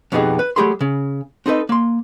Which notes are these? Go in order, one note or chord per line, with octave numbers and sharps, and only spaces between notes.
F2 B2 B3 D#4 G4 G#4
B4
F#3 A3 G4 G#4 B5 C6
C#3
C4 D#4 A4 B4 D#5
A#3 C6